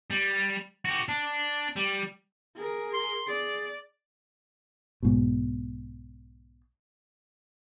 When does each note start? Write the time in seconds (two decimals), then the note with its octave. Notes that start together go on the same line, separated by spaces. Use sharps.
0.10 G3
0.85 F#4 G4
1.09 D4
1.76 G3
2.56 G#4 A#4
2.93 C6
3.27 G#4 D5
5.03 B1 G#2 B2